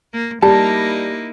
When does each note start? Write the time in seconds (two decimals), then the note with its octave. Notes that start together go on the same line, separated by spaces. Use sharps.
0.13 A#3
0.42 G3 A#3 D#4 E4 A5